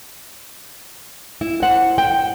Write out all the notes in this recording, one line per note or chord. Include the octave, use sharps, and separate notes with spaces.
E4
C5 F#5
G5